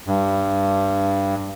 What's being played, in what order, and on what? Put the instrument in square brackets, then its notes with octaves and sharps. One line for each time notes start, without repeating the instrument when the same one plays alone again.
[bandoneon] G2